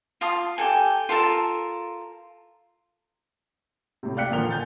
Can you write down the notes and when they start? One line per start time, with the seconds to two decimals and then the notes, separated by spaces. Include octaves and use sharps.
0.21 F4 F5 A5 D#6
0.58 G4 A4 G#5
1.09 F4 A4 A#4 A5
4.03 A2 C3
4.17 D5 F5 G5 F#6 B6 C#7
4.31 A#2 D3 F3 A#4 F7 G7
4.51 G#5 G6 A6